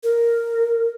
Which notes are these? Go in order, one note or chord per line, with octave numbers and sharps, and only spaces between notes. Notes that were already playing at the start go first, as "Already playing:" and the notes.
A#4